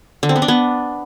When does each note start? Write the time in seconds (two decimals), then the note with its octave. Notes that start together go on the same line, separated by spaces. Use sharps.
0.23 D3
0.29 C4
0.36 B3
0.42 D4
0.48 B3